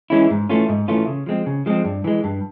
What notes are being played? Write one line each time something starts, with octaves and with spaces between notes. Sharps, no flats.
E3 G#3 C#4 E4
G#2
E3 A3 C#4 F4
G#2
E3 A3 C#4 F4
C#3
F3 G#3 C4
C#3
F3 G#3 C4
G2
E3 G#3
G2